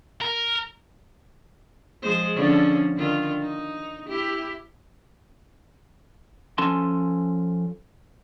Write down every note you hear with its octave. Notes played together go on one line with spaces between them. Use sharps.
A#4
F3 G#3 C5
D3 F3 C#4
D3 D#3 F4
D#4
E4 G4
F3 C#4 A4 G#5 A5 C6